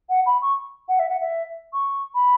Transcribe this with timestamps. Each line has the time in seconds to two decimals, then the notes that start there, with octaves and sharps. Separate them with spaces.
0.09 F#5
0.26 B5
0.42 C#6
0.88 F#5
0.99 E5
1.09 F#5
1.21 E5
1.73 C#6
2.15 B5